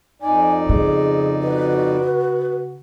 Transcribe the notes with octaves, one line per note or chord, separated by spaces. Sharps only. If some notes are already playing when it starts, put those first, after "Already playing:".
F2 D#4 D5 G#5
C#3 G#4
F#4 B4